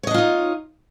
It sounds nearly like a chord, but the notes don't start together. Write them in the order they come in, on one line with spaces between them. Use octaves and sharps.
C#5 D#5 D4 F4 D#4